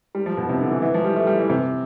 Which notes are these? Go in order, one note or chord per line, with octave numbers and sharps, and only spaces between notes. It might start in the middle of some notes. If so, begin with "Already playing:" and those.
G3
F3
B2
C3
D3
E3
E3
F3
G3
A3
G3
E3
C3